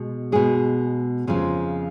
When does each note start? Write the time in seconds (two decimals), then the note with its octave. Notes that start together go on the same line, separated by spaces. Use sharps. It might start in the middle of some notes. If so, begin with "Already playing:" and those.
Already playing: B2 G#3
0.32 B2 G#3 G#4
1.27 F2 C#3 F3 G#3